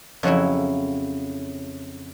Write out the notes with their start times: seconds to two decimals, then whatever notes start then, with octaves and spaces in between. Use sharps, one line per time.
0.23 F2 C#3 F#3 C#4 E4